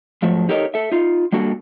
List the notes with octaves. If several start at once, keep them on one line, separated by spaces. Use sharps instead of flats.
G#2 F3 F#3 A3
D#4 G4 A4 A#4 C#5 D#5
A4 E5
D#4 F4
G3 A#3 D4 F#4 A4